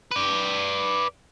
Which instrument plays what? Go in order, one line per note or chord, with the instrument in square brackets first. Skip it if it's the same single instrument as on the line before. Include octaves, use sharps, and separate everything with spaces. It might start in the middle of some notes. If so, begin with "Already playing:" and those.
[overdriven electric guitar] B4 D5